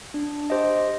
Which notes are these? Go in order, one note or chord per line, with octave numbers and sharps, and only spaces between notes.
D4
G4 C5 D#5